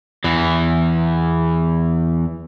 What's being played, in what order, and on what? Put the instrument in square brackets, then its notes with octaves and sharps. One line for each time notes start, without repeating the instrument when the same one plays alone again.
[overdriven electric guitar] E2 E3